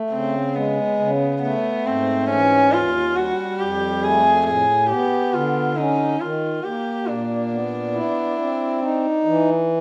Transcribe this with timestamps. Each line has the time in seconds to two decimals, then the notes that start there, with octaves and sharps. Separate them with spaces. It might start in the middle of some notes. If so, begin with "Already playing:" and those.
Already playing: A3
0.12 C#3 C4
0.55 G#3 B3
1.00 C#3
1.43 A3 B3
1.86 G#2 C4
2.29 E3 C#4
2.72 D#2 F4
3.16 G3 F#4
3.59 F2 G4
4.03 A3 G#4
4.46 A2 G#4
4.90 B3 G4
5.34 D3 F4
5.77 C#4 D#4
6.20 D#3 F4
6.64 A#3 G4
7.07 A#2 D4
7.51 B3
7.94 E4
8.38 C4
8.82 D#4
9.25 E3